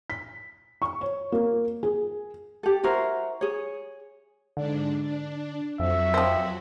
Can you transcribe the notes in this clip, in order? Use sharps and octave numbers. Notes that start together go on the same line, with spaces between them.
B6
C#6
C#5
A#3
G#4
G4 A4
E4 F#4 A#4 C5
G#4 C#5
G#2 D3 D4
D4
F2 F#3 F#4 E5
F3 C4